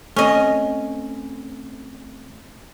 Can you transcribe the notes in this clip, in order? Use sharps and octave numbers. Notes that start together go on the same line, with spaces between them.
A3 C4 C#4 D#5